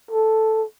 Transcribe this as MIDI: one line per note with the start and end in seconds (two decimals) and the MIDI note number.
0.11 0.65 69